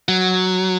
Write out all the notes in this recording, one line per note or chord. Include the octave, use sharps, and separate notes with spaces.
F#3